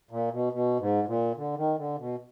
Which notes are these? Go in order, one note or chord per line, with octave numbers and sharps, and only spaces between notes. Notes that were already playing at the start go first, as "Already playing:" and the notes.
A#2
B2
B2
G#2
A#2
D3
D#3
D3
B2